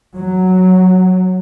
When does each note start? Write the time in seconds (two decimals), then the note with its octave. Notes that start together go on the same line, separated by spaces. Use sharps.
0.14 F#3